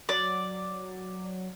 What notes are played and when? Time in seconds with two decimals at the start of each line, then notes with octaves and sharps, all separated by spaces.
0.09 F#3 D5